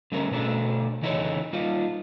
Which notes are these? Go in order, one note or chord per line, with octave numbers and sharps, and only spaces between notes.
D3 G3 A3 C#4 A#4
B2 A3 D4 A4
C#3 E3 D#4 E4 A4 C#5
G3 D#4 F4